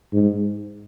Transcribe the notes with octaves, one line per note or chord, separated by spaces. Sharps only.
G#2